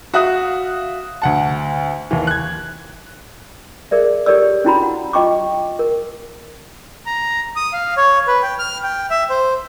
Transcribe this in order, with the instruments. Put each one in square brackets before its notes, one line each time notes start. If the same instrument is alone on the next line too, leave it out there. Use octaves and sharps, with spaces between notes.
[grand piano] F#4 E5 F5 D#6 F#6
D2 F#5 A5
D#2 E3
F#6 G#6
[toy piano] G#4 A#4 D5 E5
G4 A4 A#4 C#5 D5 E6
C#4 D4 E4 F#4 A#5 B5
F#5
F4 D#5 G5 C#6 D6
A#4
[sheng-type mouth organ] A#5
D#6
F5
C#5
B4
G5
F6
G5
E5
C5